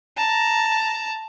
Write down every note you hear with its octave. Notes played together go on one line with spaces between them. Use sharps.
A5 A#5